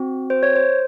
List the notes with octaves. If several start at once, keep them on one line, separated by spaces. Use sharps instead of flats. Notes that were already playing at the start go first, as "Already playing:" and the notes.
Already playing: C4 F#4
C5
C#5
C5